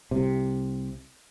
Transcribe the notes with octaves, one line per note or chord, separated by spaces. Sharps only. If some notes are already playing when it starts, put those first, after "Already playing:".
C2 C3